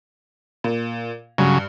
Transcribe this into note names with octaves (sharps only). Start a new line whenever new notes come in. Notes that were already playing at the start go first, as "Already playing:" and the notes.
A#2
G2 C#3 F#3